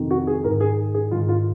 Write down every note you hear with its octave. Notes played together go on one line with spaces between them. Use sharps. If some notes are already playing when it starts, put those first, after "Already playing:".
Already playing: F2 C3 D#3
F#4
G#4
G#2 D#3 A#4
G#4
G#4
G#2 D#3 F4
F4